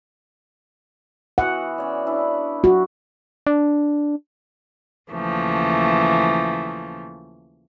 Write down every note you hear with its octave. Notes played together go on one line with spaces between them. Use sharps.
E3 B3 F#4 F#5
C#4 C#5 D5
D4 E4 B4
F#4 G4
D4
D#2 C#3 E3 F3 A3